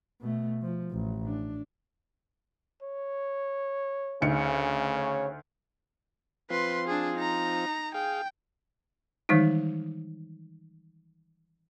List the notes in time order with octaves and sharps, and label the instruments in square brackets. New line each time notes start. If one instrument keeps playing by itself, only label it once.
[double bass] B2 A3
F3
A1
D4
[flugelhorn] C#5
[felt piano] D2 D#4 C#7 [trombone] C#3
[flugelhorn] C#5
[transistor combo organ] F3 C4 F4 [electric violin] B4 C6
[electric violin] D4 G#4
D#4 A#5
[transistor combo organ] G#4 F5 [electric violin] G5
[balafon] D#3 E3 G3 G#3 D#4